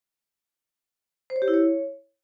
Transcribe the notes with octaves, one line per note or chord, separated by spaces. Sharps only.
C5
C#5
G4
E4
C#5